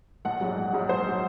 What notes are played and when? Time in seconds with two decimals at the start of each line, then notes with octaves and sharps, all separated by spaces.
0.25 A#1 F#5
0.41 G#2 F#3
0.57 A#1
0.73 G#2 F#3
0.89 A#1 C5
1.08 F#3